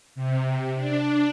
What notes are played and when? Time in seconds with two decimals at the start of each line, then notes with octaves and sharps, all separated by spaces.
0.15 C3
0.76 D4